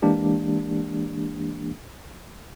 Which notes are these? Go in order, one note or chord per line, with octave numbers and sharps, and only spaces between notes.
E3 G#3 A#3 D4 G4